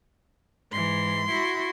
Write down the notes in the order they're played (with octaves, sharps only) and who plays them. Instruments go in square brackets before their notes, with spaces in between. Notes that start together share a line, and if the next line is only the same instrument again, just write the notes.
[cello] G#2 E3 [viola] C6
[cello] E4 F#4